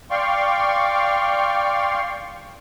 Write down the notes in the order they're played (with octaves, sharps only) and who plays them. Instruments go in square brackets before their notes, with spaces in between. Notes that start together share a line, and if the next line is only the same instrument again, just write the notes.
[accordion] D5 F5 G5 C6 C#6